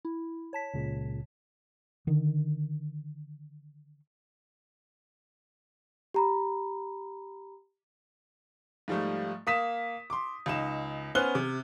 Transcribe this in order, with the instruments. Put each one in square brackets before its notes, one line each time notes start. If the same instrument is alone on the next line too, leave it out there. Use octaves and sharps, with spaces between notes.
[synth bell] E4
C#5 A5 B6
[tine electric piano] C#2 A#2 C#3
[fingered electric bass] D3 D#3
[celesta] G4 A#5 B5
[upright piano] G#2 F3 G3 A3
A#3 D#6 B6 E7
C6 D6
C#2 D#4 E7
B3 C#4 C5 F6 F#6 G7
C3